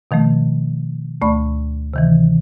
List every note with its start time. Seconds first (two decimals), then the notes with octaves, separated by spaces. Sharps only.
0.11 B2 D#3 F3 A3
1.21 D2 A3 D5 B5 C#6
1.94 C3 D#3 E3